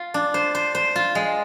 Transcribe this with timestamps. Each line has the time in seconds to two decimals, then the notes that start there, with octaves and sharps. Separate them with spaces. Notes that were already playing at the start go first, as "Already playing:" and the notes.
Already playing: F4
0.14 D4
0.34 C5
0.55 C5
0.75 C5
0.96 F4
1.15 G#3